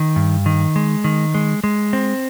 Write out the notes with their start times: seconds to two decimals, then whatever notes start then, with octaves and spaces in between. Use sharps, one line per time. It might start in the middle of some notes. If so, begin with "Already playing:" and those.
Already playing: D#3
0.16 G2
0.46 D#3
0.76 G#3
1.04 D#3
1.34 G#3
1.64 G#3
1.93 C4